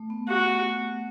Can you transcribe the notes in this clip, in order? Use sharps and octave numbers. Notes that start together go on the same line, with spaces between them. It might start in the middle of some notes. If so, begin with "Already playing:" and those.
Already playing: A3
B3
F#4